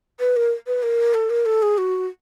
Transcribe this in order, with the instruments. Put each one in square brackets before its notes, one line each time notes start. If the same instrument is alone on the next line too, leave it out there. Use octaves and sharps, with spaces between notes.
[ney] B4
A#4
B4
A#4
A4
A#4
A4
G#4
F#4